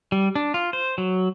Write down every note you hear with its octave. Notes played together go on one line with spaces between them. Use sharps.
G3
D4
F4
C5
F#3